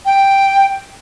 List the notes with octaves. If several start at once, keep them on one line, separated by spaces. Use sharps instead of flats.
G5